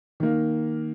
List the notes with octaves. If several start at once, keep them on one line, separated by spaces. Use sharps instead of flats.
D#3 A#3